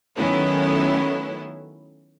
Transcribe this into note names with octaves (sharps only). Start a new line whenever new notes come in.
D#3 F#3 A3 B3 C#4 E4